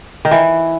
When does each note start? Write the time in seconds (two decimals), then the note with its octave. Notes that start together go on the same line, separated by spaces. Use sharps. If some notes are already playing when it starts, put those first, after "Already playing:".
0.25 D#3
0.31 E3